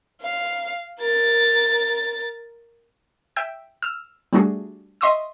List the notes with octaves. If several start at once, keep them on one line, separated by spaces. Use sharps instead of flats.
F5
A#4 A6
E5 G5 E6 G6
E6 F6
G3 A3 D4 F#4 G#4
D#5 E5 C6 C#6 D#6 E6